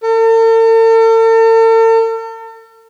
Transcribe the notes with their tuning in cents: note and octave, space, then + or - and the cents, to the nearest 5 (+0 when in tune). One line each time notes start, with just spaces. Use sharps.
A4 +45